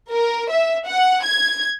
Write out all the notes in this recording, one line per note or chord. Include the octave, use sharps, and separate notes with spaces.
A#4
E5
F#5
G#6